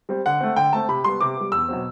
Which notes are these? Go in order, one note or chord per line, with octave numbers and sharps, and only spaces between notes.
G3 C4
D3 F#5
A3 C4
D3 G5
A3 C4 A5
C3 B5
G3 B3 C6
C3 D6
G3 B3
E2 E6
B2 F#3 C4